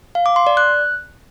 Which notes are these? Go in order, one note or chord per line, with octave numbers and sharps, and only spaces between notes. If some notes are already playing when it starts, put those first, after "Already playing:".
F5
D6
C6
D5
F#6